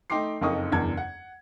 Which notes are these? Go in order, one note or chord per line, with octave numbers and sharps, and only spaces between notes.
A3 D#4 G5 C6 D6 C7
F#1 F2 D#4 C#6 D#6
F#1 E2 G2 A5 G#6
F#5